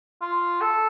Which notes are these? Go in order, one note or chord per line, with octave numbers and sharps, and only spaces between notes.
F4
A4